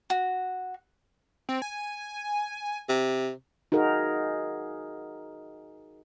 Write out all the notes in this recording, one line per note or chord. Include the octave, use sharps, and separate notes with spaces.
F#4
C4
G#5
C3
D#4 F#4 G#4 A#4